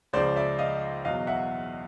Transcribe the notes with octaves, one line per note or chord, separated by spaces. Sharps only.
C#2 C#3 F3 C5 D5
D5 E5
D#5 F5
E2 B2 F#3 D#5 F5
E5 F#5